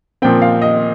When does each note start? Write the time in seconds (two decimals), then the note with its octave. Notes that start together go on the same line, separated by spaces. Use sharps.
0.22 A#2 F3 C4 G5
0.42 F5
0.62 D#5